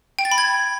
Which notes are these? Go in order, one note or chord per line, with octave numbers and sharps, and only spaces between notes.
G5
A6
B5
G#6